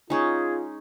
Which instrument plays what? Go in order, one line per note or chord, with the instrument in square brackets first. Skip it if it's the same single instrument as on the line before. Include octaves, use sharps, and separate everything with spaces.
[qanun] G#3 C#4 D#4 [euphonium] F4 [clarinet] G#4